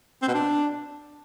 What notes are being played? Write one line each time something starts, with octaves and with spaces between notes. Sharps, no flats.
C4
B2
D4